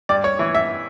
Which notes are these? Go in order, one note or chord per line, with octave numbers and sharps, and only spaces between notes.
G2 D5
C#5
E3
E5